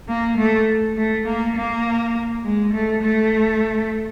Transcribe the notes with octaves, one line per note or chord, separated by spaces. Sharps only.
A#3
A3
A3
A#3
A#3
G#3
A3
A3